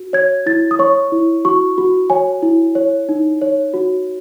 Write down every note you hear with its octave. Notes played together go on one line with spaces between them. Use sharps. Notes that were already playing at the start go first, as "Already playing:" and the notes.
Already playing: F#4
C#5 G#6
E4 A6
D#6
C#5 C#6
E4
F#4 C#6
F#4
C#5 G#5
E4
C#5
D#4
C#5
F#4